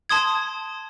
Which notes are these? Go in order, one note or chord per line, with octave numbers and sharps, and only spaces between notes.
A5 C6 D#6 G#6